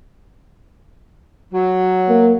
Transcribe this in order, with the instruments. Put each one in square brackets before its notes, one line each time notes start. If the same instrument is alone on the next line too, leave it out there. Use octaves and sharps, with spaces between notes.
[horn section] F#3
[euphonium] A#3